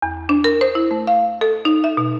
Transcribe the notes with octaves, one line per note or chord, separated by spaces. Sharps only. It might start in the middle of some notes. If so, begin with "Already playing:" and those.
E2
D4
A#4
C5
E4
A3
F5
A4
D#4
E5
B2